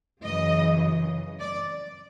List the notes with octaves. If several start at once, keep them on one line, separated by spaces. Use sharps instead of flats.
F#2 C#3 E3 D#5
D5